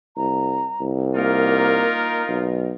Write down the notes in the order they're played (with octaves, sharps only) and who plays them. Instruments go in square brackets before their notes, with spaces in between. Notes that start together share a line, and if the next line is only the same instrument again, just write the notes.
[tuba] C2 [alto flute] A#5
[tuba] C2
[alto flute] A#3 [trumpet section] D#4 F4 A#4
[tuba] B1